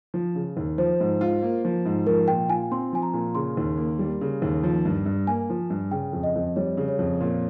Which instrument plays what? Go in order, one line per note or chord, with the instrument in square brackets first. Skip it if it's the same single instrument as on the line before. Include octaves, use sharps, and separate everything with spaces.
[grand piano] F3
C#3
D#2
[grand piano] F3 [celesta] C5
[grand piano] G#2
F4
A#3
F3
G#2
[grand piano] F3 [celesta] A#4
[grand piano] A#2 [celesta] G5
[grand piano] F4 [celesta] G#5
[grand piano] C4 [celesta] C6
[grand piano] F3 [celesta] G#5
[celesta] A#5
[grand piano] A#2
[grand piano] C#3 [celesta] C6
[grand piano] D#2
A#3
G3
C#3
D#2
F3
G2
G2
[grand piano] A#3 [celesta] G#5
[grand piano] F3
G2
[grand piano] C#3 [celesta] G5
[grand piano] F2
[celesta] D#5
[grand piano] F2
[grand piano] G3 [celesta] C#5
[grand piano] C#3
[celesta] C#5
[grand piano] F2
A#2